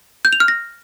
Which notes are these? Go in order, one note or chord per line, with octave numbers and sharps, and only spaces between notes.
G6
F7
F6
A#6